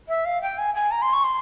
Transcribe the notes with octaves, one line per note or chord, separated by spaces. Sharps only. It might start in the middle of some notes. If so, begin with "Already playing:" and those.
E5
F5
G5
G#5
G#5
A#5
C6
C#6
C6